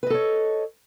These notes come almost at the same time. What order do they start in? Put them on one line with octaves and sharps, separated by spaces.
B4 D#5 A4 C#5